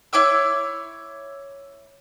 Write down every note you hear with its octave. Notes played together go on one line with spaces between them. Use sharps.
E4 C#5 D6 E6